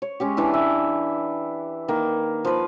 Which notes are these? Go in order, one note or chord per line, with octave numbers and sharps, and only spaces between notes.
C#5
G#3 C#4 G4
E3 D4 E4
E5
D#3 A#3
F3 B4